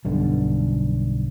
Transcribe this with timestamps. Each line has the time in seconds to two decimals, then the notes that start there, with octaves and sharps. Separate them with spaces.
0.05 B1 G2 D3